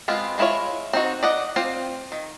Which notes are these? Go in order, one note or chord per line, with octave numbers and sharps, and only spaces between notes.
G#3 B3 C4 F4
G#3 A3 E4 F4 C#5
C4 D#4 F#4
D5 D#5 F#5
C4 F4 C5
D#3